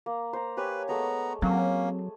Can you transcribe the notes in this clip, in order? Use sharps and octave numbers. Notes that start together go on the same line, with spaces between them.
A#3
C5 A#5
G4 B4 C#5 G#5
G#3 A3 B3 A4 A#5
F#3 A#3 C4 C#4